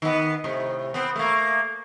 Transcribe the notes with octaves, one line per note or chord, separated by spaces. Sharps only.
D#3 B3
A2 C3
B3 C4
A3 A#3